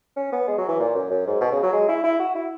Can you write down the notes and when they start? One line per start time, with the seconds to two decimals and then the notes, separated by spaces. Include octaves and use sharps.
0.16 C#4
0.32 B3
0.48 G#3
0.58 F#3
0.69 E3
0.79 A#2
0.95 F#2
1.11 F#2
1.27 G#2
1.41 B2
1.52 C#3
1.63 F#3
1.73 G#3
1.89 E4
2.03 E4
2.20 F#4
2.35 E4